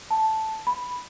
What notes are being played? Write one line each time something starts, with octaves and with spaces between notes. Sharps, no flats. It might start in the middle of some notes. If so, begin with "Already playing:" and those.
A5
B5